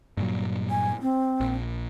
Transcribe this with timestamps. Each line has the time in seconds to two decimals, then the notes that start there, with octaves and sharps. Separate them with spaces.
0.17 G2 A#2 F#3
0.71 G#5
1.02 C4
1.40 A#1